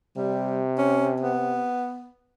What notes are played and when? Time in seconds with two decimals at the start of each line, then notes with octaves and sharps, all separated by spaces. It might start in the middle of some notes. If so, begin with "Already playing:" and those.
0.17 C3 G3
0.78 C#4
1.20 B3